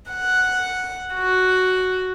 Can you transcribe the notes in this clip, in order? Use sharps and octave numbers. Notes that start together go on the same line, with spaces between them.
F#5
F#4